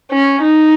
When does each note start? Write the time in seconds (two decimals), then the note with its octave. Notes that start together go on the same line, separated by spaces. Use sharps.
0.12 C#4
0.42 D#4